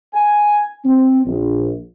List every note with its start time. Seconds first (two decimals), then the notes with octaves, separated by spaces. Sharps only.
0.14 G#5
0.85 C4
1.26 A#1